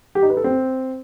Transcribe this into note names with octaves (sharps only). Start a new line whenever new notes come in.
G4
D#4
B4
A4
C4